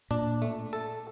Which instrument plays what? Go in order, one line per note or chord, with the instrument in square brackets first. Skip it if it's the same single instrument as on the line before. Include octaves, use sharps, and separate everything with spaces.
[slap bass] A#2 [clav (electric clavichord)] D4
[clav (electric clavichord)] A3
A4